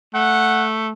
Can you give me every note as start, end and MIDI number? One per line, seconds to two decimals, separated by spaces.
0.14 0.91 57
0.14 0.64 78